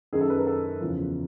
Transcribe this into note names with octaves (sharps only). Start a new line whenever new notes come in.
F#2 D#3 G#4
A4
B4
A#4
A4
E2 C#3 F3